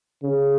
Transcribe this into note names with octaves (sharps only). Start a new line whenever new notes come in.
C#3